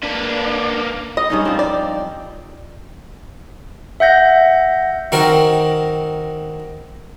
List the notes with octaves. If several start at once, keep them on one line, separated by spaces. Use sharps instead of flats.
A#3 D4 B4
D#5
G2 C#4 D#4
F3 C4
D5
E5 F#5 G6 A#6
D#3 C4 F#4 A#4